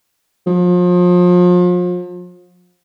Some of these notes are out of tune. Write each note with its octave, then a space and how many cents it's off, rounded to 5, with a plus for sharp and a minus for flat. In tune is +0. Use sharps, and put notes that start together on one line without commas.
F3 +35